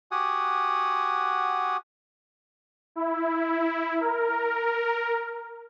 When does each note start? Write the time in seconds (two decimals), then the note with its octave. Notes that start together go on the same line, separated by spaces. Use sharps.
0.11 F#4 G4 F#5 G#5 D#6
2.96 E4
4.00 A#4